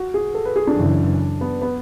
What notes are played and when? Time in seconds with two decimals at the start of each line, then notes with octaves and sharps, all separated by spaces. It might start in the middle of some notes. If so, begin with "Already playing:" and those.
Already playing: F#4
0.14 G#4
0.34 A4
0.45 B4
0.56 G#4
0.67 D4
0.77 F#2 C#3 E3
1.41 B3
1.62 B3